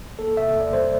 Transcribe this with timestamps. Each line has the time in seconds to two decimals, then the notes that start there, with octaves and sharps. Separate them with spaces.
0.19 A#3 A4
0.37 C3 E5
0.56 E2
0.61 D5
0.73 G3 C5